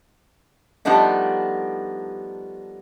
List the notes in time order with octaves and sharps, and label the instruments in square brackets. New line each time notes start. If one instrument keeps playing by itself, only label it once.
[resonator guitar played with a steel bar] F3 G3 A3 B3 D4 D#4